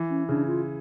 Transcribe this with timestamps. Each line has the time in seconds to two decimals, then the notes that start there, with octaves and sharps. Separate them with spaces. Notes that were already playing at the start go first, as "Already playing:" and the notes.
Already playing: E3
0.10 C#4
0.29 C#3 D4
0.47 F4